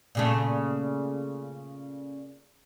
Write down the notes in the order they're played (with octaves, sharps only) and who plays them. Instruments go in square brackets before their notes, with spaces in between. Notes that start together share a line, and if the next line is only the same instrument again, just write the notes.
[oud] A#2 C#3 A3